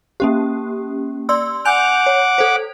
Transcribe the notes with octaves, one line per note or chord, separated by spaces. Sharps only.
A#3 C#4 G4
D5 C6 E6
F#5 G#5 D6 G6 F7
C#5
A4 C5